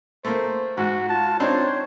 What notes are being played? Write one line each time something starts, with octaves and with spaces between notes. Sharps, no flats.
A3 A#3 C5
G#2 F#4
F4 A5
C4 D4 D#4 C5 C#5